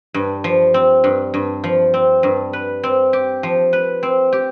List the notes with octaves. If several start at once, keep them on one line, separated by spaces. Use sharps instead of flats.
G2
F3
C4
G2
G2
F3
C4
G2
B4
C4
G4
F3
B4
C4
G4